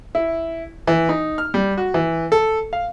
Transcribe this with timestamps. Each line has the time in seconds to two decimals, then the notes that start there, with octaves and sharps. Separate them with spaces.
0.15 E4
0.87 E3
1.09 D#4
1.38 F6
1.54 G3
1.78 F#4
1.94 E3
2.32 A4
2.73 F5